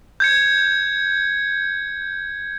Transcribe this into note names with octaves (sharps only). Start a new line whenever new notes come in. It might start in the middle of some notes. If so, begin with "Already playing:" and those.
G6 G#6 C#7